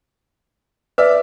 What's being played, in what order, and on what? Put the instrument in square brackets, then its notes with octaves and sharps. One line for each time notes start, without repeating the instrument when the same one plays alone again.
[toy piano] B4 [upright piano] D5 E5